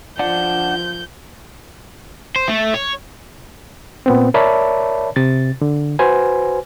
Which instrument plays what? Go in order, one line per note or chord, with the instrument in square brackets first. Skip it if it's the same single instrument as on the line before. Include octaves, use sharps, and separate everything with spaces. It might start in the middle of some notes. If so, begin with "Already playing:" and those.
[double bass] F3 [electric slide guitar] D4 D5 F#5 [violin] G6
[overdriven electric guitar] C5
A3
C#5
[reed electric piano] A#2 B3 C4
A#4 C#5 D5 E5 A5 B5
C3 A6
D3
F#4 B4 C5 G#5